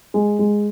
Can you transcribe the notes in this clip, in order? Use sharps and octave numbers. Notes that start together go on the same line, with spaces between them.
G#3
G#3